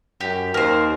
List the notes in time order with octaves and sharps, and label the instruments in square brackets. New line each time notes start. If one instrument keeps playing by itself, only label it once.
[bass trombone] F#2 [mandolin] G4
[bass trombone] D#2 [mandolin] A#4 C5